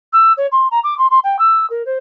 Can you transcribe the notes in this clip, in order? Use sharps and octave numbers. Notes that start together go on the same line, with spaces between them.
E6
C#5
C6
A#5
D6
C6
C6
G5
E6
A#4
C5